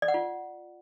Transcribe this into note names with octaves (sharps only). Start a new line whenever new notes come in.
D5
F#5
F4